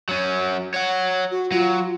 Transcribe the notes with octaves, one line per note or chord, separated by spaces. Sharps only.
F#3 C#4
C#5 F#5
F#4
F#3 F4